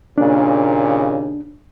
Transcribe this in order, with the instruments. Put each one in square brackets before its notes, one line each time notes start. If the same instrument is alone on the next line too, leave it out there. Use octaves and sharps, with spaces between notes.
[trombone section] D#2 A#2 C#3 [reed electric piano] D4